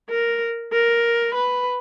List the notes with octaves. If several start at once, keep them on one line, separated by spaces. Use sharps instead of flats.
A#4
A#4
B4